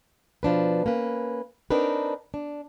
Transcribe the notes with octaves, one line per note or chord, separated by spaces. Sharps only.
B2 F3 D4 B4
A#3 C#4 B4
C4 D4 D#4 A#4 B4
D4